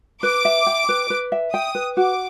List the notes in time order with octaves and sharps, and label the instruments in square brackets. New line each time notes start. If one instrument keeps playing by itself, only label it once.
[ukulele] B4 [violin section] D6
[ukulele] E5
G5
B4
B4
E5
[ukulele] G5 [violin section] D#6
[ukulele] B4
[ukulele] F#4 [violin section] D6